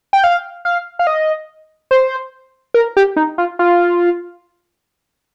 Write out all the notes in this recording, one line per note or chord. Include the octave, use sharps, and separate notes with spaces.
G5
F5
F5
F5
D#5
C5
A#4
G4
D#4
F4
F4